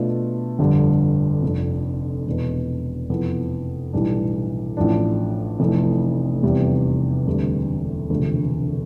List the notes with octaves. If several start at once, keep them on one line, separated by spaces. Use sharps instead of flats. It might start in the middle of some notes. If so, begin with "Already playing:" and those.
Already playing: B2 A3 D4 F4
G1 F2 D3 G3
F1 F2 D3
E1 E2 B2
F1 F2 E3 B3
B1 A2 E3 G3 D4
A1 A2 F3 A3 D4
F1 F2 E3 A3
F1 E2 C3 G3 B3
E1 D2 C3 G3
E1 D2 C3 F3